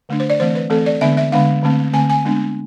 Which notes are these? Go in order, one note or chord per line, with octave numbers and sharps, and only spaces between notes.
D3 A3 D4
C5
D5
E3 A3 C4 C5
B4
E3 A3 C4 A4
D5
D3 G#3 B3 D4 E5
E5
D3 G#3 B3 D4 F5
D3 A3 C4
D3 A3 C4 G#5
G#5
G#3 B3 D4